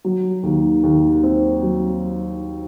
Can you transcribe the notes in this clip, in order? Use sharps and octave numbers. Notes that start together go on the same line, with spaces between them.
F#3
D#2
D#2
C4
F#3